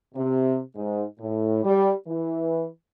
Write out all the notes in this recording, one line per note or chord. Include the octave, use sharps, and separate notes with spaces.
C3
G#2
A2
G3
E3